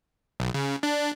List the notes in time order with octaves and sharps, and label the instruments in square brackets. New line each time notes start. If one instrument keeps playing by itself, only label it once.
[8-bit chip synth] B1
C#3
D4